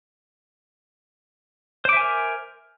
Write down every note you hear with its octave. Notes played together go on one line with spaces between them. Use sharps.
A#4 C5 E5 G#5 D6